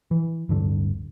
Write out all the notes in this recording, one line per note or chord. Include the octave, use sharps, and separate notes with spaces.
E3
D1 G2 D3